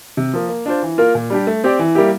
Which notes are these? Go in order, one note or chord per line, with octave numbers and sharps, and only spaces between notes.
C3
F3 A#3
A#3
D4 F4 C5
E3
A#3 F4 A#4
A#2
G3 D4 G4
A3
C4 G4 D5
E3
G3 A#3 E4 G4